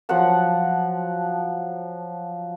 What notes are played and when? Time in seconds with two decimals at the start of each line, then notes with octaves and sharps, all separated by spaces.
0.09 F3 F#3 F#5 A5